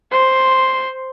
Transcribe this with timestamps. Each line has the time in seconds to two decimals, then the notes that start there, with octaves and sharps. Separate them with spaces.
0.11 C5